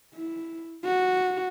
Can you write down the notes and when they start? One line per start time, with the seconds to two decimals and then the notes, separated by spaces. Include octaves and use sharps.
0.15 E4
0.84 F#4